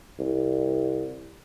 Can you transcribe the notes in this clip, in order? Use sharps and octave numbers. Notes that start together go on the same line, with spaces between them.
C2